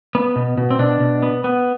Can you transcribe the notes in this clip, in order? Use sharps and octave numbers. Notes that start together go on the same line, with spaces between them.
B3
B2
B2
C4
B2 D4
B2
B3
B3